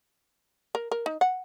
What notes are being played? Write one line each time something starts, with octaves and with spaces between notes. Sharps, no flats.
A#4
A#4
D#4
F#5